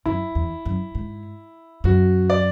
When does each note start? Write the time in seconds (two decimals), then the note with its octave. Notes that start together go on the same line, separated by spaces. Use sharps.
0.06 F#2 E4
0.35 E2
0.66 F#2
0.95 G#2
1.84 F#2 F#4
2.30 D5